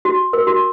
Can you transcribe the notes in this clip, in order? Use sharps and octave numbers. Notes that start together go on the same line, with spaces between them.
F#4
A#4
F#4